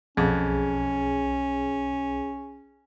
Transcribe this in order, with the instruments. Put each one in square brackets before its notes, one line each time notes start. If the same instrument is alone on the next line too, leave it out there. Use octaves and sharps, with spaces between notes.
[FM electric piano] B1 [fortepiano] F2 [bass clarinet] C#4 [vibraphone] G#4